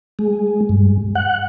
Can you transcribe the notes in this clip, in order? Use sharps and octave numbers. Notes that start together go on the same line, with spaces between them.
G#3
G2
F#5